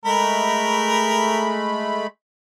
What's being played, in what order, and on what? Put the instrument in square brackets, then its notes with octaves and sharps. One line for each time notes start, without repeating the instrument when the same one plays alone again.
[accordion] G#3 A3 B5 [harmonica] A#4